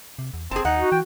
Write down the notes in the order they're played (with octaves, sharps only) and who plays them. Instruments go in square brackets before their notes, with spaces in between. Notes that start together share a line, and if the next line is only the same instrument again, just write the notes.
[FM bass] C3
E2
[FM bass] F#1 [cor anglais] C4 [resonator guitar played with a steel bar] G#4 A5
[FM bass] D#2 [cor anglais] D#4 [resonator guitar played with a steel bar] F#5
[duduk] F#4
[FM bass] E3 [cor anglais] G5